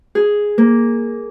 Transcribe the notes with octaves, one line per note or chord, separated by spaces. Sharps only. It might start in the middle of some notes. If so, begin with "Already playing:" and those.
G#4
A#3